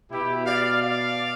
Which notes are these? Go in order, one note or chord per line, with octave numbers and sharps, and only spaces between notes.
B2 E4 G4
D5 F5
D5 F5